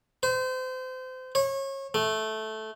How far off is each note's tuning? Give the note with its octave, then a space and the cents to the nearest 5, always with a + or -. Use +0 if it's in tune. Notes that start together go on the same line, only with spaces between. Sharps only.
C5 -30
C#5 -30
A3 -10